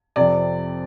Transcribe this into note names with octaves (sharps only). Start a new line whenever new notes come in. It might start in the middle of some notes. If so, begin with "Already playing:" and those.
F2 C3 D5